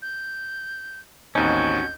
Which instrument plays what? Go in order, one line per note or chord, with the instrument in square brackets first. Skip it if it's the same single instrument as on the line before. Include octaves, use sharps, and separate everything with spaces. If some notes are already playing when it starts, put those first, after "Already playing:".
[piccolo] G6
[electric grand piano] A1 D#2 C4 [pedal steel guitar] C#4 F#4 [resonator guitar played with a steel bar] D#4 [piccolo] G6